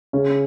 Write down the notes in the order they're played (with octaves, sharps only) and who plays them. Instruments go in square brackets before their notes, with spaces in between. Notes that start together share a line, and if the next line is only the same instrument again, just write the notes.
[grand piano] C#3 C#4